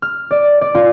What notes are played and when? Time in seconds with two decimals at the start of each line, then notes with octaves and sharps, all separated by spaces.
0.02 F6
0.31 D5
0.61 D5
0.75 F4